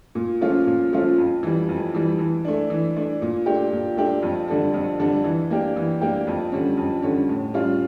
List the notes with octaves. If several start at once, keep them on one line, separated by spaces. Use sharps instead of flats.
A#2
F3 A3 C#4 F4
A#2
F3 A3 C#4 F4
F2
E3 G3
F2
E3 G3
E3
A3 D4
E3
A3 D4
A#2
A3 D4 G4
A#2
A3 D4 G4
F2
D3 G3 D4 A4
F2
D3 G3 D4 A4
E3
A#3 D4 G4
E3
A#3 D4 G4
F2
D3 G3 C#4
F2
D3 G3 C#4
A2
G3 C#4 F4